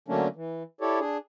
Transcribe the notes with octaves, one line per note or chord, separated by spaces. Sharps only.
D3 F#3 A3 A#3 C#4 D4
E3
E4 G4 A4 C#5 D5
D4 G#4